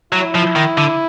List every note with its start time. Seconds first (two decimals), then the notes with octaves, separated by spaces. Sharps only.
0.12 F#3 E4
0.35 F3
0.56 D#3
0.78 D3